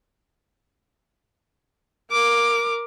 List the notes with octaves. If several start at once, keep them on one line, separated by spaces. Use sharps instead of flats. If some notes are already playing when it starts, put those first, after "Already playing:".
A#4 D6